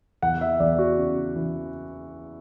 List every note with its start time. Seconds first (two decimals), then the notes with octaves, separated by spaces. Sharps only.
0.22 E2 F#5
0.41 E5
0.60 E2 D5
0.79 F#4
0.98 C#3
1.36 E3